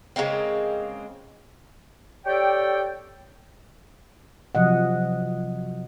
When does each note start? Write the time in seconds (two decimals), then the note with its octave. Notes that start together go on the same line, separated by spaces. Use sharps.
0.16 C#3 G#3 A#3 C4
2.26 G4 A4 C#5 D5 G5
4.55 C3 F3 F#3 D#5 F#5